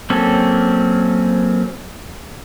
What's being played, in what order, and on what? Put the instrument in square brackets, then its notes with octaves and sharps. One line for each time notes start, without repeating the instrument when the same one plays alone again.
[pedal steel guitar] F#3 A#3 C4 C#4 A4